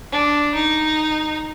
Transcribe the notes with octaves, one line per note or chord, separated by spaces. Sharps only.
D4
D#4